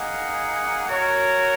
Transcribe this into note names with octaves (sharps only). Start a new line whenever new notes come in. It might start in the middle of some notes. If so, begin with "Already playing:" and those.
Already playing: A#3 D#4 G#4 F#5
F#4 A#4 C#5